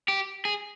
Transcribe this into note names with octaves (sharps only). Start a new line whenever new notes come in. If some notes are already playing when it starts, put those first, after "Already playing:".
G4
G#4